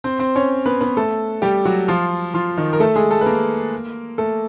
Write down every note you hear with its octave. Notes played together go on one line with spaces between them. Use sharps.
C4 C5
C4 C5
C#4 C#5
B3 B4
B3 B4
A3 A4
G3 G4
F#3 F#4
F3 F4
F3 F4
D#3 D#4
A#4
A3 A4
G#3 G#4
A3 A4
B4
A#3 A#4
A3 A4